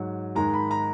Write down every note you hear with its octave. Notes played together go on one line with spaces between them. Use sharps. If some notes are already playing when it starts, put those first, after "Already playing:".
Already playing: G#2 F#3
G#2 D#3 G#3 A#5
B5
A#5